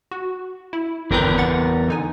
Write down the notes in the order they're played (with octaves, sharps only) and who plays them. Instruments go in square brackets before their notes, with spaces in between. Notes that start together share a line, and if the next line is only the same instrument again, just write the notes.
[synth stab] F#4
E4
[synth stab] G1 C4 G6 [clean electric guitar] E2 A#4 B4
[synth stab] F#5 A6
D3 D#4 G#5